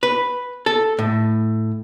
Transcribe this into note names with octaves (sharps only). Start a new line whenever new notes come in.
B4
A4
A2